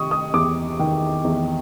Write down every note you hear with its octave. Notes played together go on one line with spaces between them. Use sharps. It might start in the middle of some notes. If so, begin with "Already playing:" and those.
Already playing: C3 D#3 C#6 D#6
D#6
E2 D6
D#3
E2